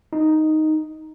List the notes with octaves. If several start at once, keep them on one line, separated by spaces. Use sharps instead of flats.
D#4